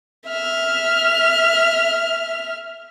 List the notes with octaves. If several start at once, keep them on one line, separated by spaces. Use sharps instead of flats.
E5 F6